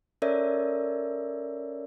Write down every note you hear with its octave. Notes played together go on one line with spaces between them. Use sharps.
C#4 A4 A#4 C#5 D5 E5